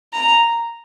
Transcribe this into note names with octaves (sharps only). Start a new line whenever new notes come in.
A#5